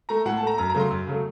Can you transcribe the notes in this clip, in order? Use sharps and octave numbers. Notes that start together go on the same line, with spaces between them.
A3 A#5
A2 F#5
A5
A3 A#5
F#2 A#5
C#3 F#3 A3 A#5
C6
F#2
C#3 F#3 A3